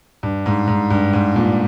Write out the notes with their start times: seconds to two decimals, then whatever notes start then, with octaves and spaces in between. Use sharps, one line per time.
0.23 G2
0.46 G#2
0.67 G#2
0.90 G2
1.13 G#2
1.36 G2 A#2